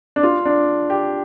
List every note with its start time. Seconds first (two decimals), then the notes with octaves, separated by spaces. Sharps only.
0.16 D4
0.23 F4
0.45 D4
0.90 G4